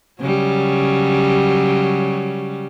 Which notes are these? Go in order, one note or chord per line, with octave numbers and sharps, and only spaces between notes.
C#3 F#3 G3